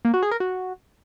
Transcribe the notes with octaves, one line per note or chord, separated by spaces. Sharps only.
A#3
F#4
G#4
A#4
F#4